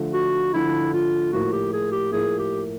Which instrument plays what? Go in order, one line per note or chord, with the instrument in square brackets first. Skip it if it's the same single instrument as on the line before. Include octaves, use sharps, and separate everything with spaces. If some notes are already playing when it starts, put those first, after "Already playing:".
Already playing: [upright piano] D3 F3 A3
[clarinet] F#4
[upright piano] D3 F3 A3 [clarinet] E4
[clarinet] F4
[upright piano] A2 F3 A#3 [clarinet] F#4
[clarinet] G4
G#4
G4
[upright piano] A2 F3 A#3 [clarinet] G#4
[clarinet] G4